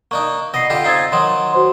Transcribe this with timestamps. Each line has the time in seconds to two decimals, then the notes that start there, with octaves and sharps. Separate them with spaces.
0.11 A#3 D4 D#4 C#6
0.54 B2 D#5 A#6 C7
0.70 D3 F4 G4
0.84 C4 D#4 F4 G#6 A6 C7
1.12 D#3 F#3 D#4 C6
1.53 F#4 C5 C6